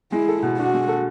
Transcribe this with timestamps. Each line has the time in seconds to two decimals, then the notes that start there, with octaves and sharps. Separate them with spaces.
0.12 G#3 E4
0.28 A4
0.43 B2
0.58 D4 F#4
0.74 G#3
0.88 A4